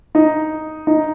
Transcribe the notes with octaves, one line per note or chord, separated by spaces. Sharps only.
D#4
D#4